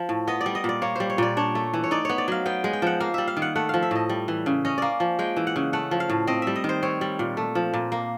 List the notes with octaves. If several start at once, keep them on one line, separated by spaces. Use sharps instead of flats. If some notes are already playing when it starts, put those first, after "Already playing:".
Already playing: F3
A2
B3 D#5
D5
G3
D#5
A#2 D5
A#3 C#5
G3 C5
C#5
A#2 D5
D4 C#5
A3
E3
C#5
D#4 D5
B3 C#5
D5
F#3 F5
B3 G5
G#3
G5
F3 F#5
A#3 F5
G3 E5
F5
D#3
F#5
A3 F#5
F3 F5
E5
A2 D#5
G3
E3
C#3
C#4 D#5
A#3 D5
F3
G#3 G5
E3
F#5
C#3
A3 F#5
F3
F5
A2
C4 D#5
G3 E5
D#5
D#3
C5
C4 C#5
G3
A#2
A3
F3
A#2
A#3